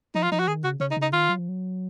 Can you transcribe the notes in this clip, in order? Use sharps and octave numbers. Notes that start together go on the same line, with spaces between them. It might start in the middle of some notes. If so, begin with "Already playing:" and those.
F3 D#4
F4
F3 D#4
F#4
D#3 G#4
C#3 F#4
C#3 C#4
D#4
C#3
D#4
D#3 F4
F#3
F3
F#3